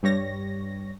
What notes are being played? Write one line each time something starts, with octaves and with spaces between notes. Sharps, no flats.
G2 G3 C#5 A#6